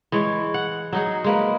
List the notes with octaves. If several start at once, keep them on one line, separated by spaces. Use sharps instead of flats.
E3 G#3 C#5
F#5
F#3 D#4 G#4
G#3 A#3 B4